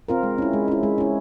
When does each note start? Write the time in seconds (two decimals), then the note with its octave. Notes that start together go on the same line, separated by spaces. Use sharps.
0.08 C4 F4 A#4
0.23 G#3
0.38 C#4 E4
0.53 G#3
0.68 C#4 E4
0.83 G#3
0.98 C#4 E4